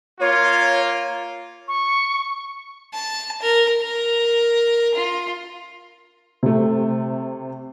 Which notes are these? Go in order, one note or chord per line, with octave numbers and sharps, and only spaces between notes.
A#3 F4 C#5
C#6
A5
A#4
A#4
F4
C3 A3